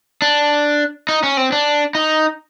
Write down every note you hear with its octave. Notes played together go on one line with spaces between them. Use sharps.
D4
D#4
C#4
C4
D4
D#4